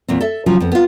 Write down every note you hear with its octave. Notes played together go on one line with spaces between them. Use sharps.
E2 A#2 C4
A4 E5
C#3 F3 F#3
F2 B3
B3 F4